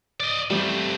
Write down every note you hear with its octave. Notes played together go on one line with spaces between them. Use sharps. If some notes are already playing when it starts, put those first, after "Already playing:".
D5 D#5
G3 A3 C4